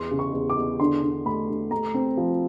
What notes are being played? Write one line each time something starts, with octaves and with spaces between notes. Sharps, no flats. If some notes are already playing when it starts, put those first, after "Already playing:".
Already playing: E2 C6
C#3
C#6
E2
D6
E2
D3 C6
D3
A3 B5
D3
A3 A#5
C4
F3